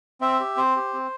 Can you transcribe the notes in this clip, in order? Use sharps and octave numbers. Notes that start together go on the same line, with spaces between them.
C4 E5
G4
C4 C5
G4
C4